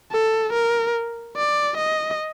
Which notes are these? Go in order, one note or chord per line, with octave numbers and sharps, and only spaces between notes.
A4
A#4
D5
D#5